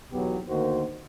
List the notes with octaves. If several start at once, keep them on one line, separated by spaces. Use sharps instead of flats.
B1 E2 B2 F#3 B3 G4
D2 D#3 A#3 F#4 C5